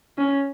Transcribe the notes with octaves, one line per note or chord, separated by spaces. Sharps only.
C#4